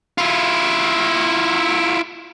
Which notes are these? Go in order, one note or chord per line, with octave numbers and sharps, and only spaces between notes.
E4 F4